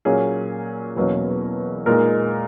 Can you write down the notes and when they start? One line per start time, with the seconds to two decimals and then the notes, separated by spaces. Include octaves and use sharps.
0.05 A#2 F#3 A#3 C#4 G#4
0.96 E2 B2 F#3 A#3 C#4
1.86 A#2 G#3 D#4 A#4